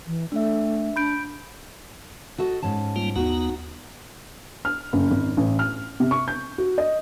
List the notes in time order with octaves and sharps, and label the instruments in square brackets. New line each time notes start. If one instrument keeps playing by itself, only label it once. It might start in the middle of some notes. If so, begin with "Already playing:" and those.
[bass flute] E3
[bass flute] A3 [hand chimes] D4 E5
[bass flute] D4 [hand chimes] B5 G6 D7
[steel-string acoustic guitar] F#4 A4 D#5
G#2 C#4 A5
[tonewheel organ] G3 A#3 F4
[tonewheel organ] D#2 B3 A#5 [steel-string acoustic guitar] D#4 F#4
[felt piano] F6
F#1
G#1
A1
F6
C3
C#6
G6
F#4
D#5